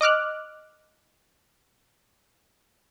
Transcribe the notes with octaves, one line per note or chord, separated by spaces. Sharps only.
D#5 D6 F6 F#6